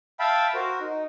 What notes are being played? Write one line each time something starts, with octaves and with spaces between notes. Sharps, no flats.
E5 F5 G5 A5 B5
F#4 A#4 C5
D#4